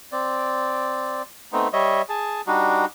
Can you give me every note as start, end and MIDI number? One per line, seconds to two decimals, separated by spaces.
0.12 1.22 60
0.12 1.22 74
1.53 1.68 57
1.53 1.68 59
1.53 1.68 60
1.53 1.68 63
1.73 2.02 55
1.73 2.02 73
1.73 2.02 75
1.73 2.02 76
2.09 2.41 68
2.09 2.41 81
2.47 2.85 55
2.47 2.85 62
2.47 2.85 63
2.47 2.85 66